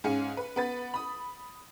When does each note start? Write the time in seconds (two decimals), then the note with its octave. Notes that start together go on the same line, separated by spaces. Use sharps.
0.04 G#2 C#4 G#4 F5 G#5 C#7
0.37 B4
0.56 B3 B4 A6
0.94 B5 D#6